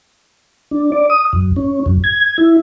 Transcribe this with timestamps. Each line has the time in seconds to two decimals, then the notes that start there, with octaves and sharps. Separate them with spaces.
0.71 D4
0.92 D5
1.10 D#6
1.33 F#2
1.56 C#4
1.86 F#2
2.04 G#6
2.38 E4